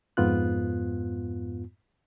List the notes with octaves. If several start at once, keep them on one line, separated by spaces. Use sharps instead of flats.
F2 G#2 B3 F4 F#6